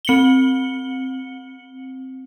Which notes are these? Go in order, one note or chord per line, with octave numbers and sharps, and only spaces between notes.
C4 C#7 F#7 G7